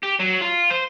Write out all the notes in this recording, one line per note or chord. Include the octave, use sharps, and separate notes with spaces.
G4
F#3
F4
C5